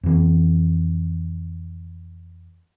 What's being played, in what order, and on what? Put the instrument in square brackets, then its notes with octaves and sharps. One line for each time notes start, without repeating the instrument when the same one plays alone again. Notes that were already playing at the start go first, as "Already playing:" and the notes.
[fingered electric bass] F2 E3